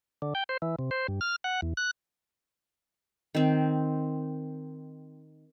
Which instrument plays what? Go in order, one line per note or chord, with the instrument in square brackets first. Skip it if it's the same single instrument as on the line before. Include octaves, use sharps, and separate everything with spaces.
[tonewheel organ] D3
G5
C5
E3
C3
C5
G2
F6
F#5
E2
F#6
[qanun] D#3 C4